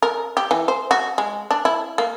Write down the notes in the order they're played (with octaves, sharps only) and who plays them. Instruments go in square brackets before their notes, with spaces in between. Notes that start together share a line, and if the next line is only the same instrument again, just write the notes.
[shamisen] A#4
G4
E3
C5
F#4
G#3
D4
E4
A#3